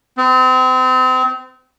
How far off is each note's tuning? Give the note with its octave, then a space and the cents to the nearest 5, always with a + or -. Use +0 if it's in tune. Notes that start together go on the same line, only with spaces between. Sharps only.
C4 -35